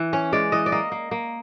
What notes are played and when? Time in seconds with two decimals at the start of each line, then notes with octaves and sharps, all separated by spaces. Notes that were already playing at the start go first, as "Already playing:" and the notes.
Already playing: E3
0.13 C#4 C#5
0.33 G#3 D5
0.52 E3 D#5
0.66 D5
0.72 A#3 D#5
0.92 A#3
1.11 A#3